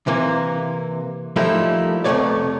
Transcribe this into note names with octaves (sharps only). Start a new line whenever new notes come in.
C3 E3 A#3
F3 G3 A3 A#3 D#4 E4
C2 F2 A3 B3 C#5 D5